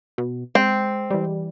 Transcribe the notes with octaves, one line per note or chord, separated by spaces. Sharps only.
B2
G#3 C4
E3 G3